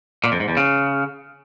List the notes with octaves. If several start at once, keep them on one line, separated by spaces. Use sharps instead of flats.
A#2
F2
G#2
E2
C#3